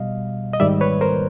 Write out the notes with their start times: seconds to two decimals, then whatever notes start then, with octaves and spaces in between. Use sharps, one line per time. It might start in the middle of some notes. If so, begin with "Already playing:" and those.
Already playing: B2 G3 D#5 F5
0.53 D#5
0.60 G#2 D#3 G3 D5 E5
0.81 B4 C#5
1.01 A#4 C5